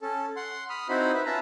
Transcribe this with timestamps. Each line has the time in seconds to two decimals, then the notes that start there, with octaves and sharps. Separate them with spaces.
0.02 C#4 A4
0.36 F#5 C6
0.69 B5 D#6 F6
0.89 C4 D#4 E4 F#4 C5 B5
1.14 B4 E5
1.26 C#4 F4 B4 E5 A5 A#5